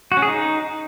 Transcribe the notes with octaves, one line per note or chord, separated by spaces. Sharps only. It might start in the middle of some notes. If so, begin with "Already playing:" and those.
F#4
C#4
G#4
D#4